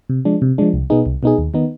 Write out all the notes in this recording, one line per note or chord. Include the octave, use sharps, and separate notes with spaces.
C3
F3 G#3 D4
C3
F3 G#3 D4
C2
B2 B3 D#4 G#4
C2
B2 B3 D#4 G#4
D#2
D#3 B3 D#4